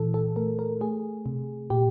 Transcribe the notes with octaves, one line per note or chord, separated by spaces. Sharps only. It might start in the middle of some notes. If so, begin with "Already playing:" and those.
Already playing: A#2 E3 A4
A4
A3 A#4
A#4
A3 G#4
C3
A#2 G4